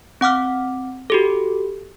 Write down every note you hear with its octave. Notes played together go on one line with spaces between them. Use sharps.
C4 F#5 D6 F6
F#4 G4 A4